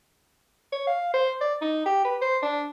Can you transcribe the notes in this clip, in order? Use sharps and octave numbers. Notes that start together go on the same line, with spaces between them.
C#5
F5
C5
D5
D#4
G4
B4
C5
D4